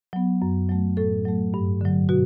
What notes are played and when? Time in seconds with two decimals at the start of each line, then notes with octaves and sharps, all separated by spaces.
0.13 F#3 B3
0.42 F#2
0.69 F#3 A3
0.97 A2 A4
1.25 F#3 A3
1.54 G2
1.81 D3 F#3
2.09 B2 F#4